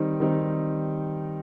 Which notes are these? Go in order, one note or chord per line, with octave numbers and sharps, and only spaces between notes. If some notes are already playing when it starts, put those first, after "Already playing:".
Already playing: D#3 G3 C4 D#4
D#3 G3 C4 D#4